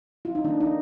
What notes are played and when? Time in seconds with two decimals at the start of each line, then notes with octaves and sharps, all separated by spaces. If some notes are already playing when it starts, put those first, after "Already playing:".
0.25 F4
0.35 D#4
0.44 D#3 A#3 D4
0.60 D#4